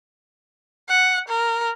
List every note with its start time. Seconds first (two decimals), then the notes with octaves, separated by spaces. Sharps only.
0.88 F#5
1.28 A#4